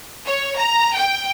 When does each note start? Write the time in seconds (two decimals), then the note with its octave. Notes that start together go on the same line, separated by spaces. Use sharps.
0.25 C#5
0.56 A#5
0.94 G5